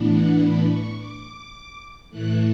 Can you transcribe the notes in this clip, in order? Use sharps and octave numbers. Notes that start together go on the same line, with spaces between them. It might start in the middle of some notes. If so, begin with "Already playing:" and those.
Already playing: A2 E3 B3 D4
F#5
B5
C#6
D6
A2 E3 A3 F#6